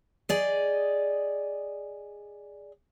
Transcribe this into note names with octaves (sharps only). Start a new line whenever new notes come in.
G#4 D5 D#5